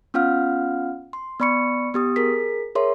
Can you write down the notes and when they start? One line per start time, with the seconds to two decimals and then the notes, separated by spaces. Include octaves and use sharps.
0.14 B3 C#4 F4 F5 F#5 F6
1.13 C6
1.40 B3 D5 B5 C#6 C#7
1.94 B3 G4 D#6
2.16 G#4 A#4 B6
2.75 G#4 A#4 C#5 E5 C6